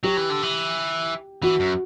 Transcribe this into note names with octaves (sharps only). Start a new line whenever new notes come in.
F#3 G4
E3
D3
E3
E3 F#4
F#2